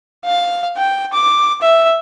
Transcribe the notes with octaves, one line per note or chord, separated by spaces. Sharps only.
F5
G5
D6
E5